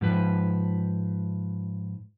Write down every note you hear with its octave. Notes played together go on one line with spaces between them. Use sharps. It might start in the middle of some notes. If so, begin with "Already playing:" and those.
G#2 F3 B4